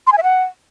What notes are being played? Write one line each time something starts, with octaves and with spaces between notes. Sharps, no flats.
C6
G#5
E5
F#5